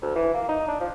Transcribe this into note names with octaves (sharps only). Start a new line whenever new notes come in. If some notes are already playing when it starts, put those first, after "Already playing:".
D2
E3
A#3
D#4
D4
F3